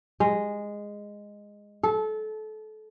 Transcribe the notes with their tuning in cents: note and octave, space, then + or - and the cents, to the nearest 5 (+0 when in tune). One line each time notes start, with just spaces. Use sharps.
G#3 -10
A4 -25